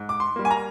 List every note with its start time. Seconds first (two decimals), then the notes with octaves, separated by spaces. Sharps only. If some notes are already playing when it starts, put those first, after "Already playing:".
Already playing: G#2
0.09 D6
0.20 C6
0.36 G3 A#3
0.45 G#5
0.51 A#5